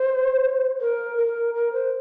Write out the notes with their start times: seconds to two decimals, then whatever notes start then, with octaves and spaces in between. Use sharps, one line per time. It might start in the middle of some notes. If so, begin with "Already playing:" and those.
Already playing: C5
0.81 A#4
1.17 A#4
1.55 A#4
1.73 C5